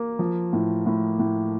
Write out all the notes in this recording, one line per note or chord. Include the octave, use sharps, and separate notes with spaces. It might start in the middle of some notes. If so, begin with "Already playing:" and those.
Already playing: A#3
F3
A2
A2
A2